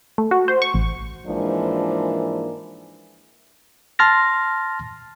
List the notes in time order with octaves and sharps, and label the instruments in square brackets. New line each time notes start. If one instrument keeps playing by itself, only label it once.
[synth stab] A3
F#4
C5
C#6
A1
[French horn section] G#2 E3 F3 G#3 A#3 D4
[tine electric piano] A5 C6 F6 A6 A#6